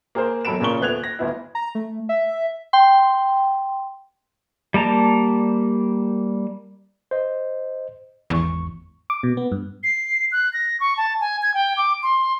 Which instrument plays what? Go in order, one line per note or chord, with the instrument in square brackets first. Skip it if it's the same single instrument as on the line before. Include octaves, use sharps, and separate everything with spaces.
[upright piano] A#3 G#4 A#4 C5
E1 F#3 A4 B5 D7 E7
A#2 C#3 A#4 C#6 G7
D#1 A3 B3 F#6 G#6 F7
A#6
G1 D2 B3 E4
[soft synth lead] A#5
A3
E5
[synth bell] G5 C6
[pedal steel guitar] G3 A#3 A5 A#5
[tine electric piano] C5 D#5
[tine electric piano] G#1 C#6 [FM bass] E2
[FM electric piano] D6
B2
B3
G2
[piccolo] C7
F#6
A#6
C#6
A5
G#5
G#6
G5
D6
C6